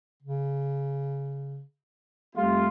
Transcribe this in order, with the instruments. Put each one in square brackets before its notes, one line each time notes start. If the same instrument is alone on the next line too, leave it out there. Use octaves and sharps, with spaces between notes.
[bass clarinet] C#3
[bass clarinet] F2 [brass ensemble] G3 A3 F4